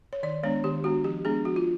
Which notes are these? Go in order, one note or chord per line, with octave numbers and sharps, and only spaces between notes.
C#5
D#3 D5
G#3 B3 D4 C#5
D#3 G4
G#3 B3 D4 F#4
F3 G4
G#3 B3 D4 G#4
F3 F#4
F4